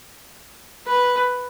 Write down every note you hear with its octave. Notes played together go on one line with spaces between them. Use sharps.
B4